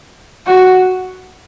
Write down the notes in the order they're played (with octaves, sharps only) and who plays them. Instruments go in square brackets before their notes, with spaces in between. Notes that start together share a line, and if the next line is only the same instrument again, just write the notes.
[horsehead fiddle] F#4